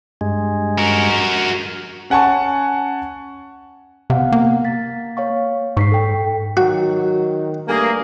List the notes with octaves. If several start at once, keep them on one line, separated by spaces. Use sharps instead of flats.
G2 G#3
F#4 A#4
C#4 F#5 G#5 A5 C#6
C3 B3 F5 F#5
A#3
A6 B6
C#5 F5 C#6
G#2 C#6 B6 C7
A4 G5
D#3 F#3 F#4
G2 A3 A#3 G#4